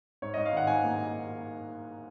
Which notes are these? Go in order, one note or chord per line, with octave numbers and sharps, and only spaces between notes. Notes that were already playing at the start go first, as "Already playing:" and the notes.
G#2 C#5
G#2 D#5
F5
D#3 F#5
G#2 G#5
A#3